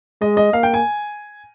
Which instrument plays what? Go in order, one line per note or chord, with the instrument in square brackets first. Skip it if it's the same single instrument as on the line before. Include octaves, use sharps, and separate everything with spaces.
[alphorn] G#3 [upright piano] D#5
[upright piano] D#5
[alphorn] A#3 [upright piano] F5
[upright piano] G5
G#5